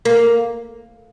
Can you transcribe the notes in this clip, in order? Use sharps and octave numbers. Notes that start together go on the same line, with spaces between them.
A#3